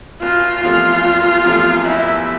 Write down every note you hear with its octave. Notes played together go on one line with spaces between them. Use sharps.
F#1 F4
E2 C3 F3 A3 F4
F#1
E2 C3 F3 A3
F#1 E4